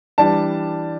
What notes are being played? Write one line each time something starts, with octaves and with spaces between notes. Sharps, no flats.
E3 G3 D4 A5